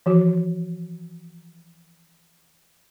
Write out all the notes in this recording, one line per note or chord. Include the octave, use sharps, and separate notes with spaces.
E3 F3 F#4